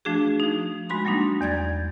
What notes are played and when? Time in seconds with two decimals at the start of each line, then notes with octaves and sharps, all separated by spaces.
0.05 F3 A3 D4 F#4 G#4
0.40 F3 D#4
0.89 G#3 F#4 B5 C6
1.05 F#3 G3 A#3 D4 D#4
1.41 E2 D5 G#6 A6